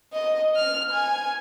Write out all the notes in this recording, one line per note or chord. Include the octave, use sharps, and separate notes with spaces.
D#5
F6
G#5